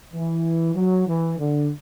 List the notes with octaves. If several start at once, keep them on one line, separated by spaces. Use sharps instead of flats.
E3
F#3
E3
D3